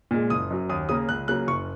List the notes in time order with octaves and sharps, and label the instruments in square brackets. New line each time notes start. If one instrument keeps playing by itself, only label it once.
[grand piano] A#2 G#3
F#1 D#6
F#2 F#3
D#2 D#6
C#3 A#3 D#6
C#2 F#6
C#3 F#3 A#3 F#6
F#1 C#6